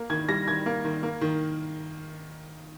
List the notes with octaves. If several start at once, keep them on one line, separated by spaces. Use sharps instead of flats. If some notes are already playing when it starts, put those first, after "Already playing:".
Already playing: A#3
D#3 G#6
G3 A#6
D#3 G#6
A#3
D#3
A#3
D#3